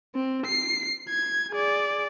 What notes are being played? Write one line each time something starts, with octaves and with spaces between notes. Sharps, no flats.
C4
C7
G#6
G#4 D5